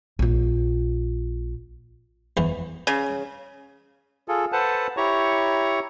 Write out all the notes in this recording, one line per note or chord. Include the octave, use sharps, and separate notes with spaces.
A#1 F4
E2 E3
C#3
F4 G#4 A4
A4 B4 C5 F#5 A5
E4 G4 C#5 A#5 C#6